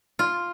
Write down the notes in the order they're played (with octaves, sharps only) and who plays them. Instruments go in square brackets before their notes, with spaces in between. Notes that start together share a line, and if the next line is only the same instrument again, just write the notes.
[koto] F4